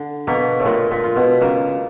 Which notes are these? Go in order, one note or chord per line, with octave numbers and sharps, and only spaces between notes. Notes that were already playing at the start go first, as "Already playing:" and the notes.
Already playing: D3
B2 A#3
A2
A#2 G#3
A#2
F4
B2
C#3 A#3